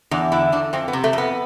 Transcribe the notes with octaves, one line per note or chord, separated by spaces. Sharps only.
E2 D4
D3 E4
E2 D4
F2 C4
B3
C3
A3
F2 B3